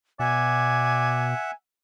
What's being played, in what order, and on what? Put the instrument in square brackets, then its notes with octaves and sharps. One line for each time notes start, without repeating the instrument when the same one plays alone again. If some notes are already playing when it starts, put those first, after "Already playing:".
[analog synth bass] B2 [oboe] D5 [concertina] E5 F#5 [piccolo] G#5